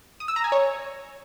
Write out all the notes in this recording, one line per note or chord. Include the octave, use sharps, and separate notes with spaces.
D#6
E6
A#5
G#5
C#5